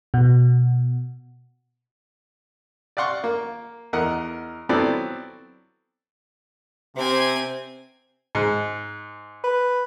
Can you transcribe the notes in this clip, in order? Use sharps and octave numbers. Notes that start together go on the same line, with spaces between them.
B2
D5 F5 F#5 C6 C#6
A#3
E2 A#4 D#5 F#5
F#3 B3 C4 E4 A4 D5
C3 C4 G#5
G#2
B4